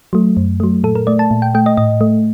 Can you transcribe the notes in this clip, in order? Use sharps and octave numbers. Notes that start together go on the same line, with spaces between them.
F#3 A3
F#2
F#3 A3
A#2 A4
A#4
A3 D5
A5
A#2
G5
A3 G5
D#5
A2 D#5
A3